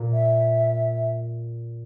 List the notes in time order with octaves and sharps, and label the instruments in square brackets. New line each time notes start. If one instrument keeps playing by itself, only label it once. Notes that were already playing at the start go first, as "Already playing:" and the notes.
Already playing: [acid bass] A#2
[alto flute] E5